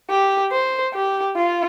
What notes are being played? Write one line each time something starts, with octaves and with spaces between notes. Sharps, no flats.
G4
C5
G4
F4